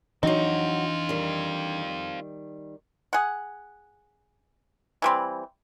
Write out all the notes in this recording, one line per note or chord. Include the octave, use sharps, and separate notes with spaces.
E3 F#3 C4 D4 D#4 F4 F#4
D#3 G3
G#4 F#5
E3 G3 C4